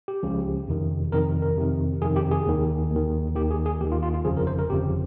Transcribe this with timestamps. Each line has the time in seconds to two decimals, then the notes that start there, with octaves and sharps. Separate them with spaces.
0.08 G4
0.23 C#2 C#3 F3
0.68 F2 C3 D#3
1.12 F2 C3 D#3 A#4
1.42 A#4
1.56 F2 C3 D#3
2.02 F2 C3 D#3 G#4
2.16 G4
2.31 G#4
2.47 D#2 D#3
2.91 D#2 D#3
3.35 D#2 D#3 G4
3.51 G#4
3.66 G#4
3.80 D#2 G4
3.84 D#3
3.92 F4
4.03 F4
4.14 F4
4.25 G1 F2 C#3 F3 G#4
4.37 A#4
4.47 C5
4.59 A#4
4.69 G1 F2 C#3 F3 G4